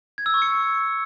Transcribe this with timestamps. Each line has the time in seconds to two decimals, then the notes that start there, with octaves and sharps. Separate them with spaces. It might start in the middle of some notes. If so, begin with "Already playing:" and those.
0.18 G#6
0.26 E6
0.34 C#6
0.42 C#7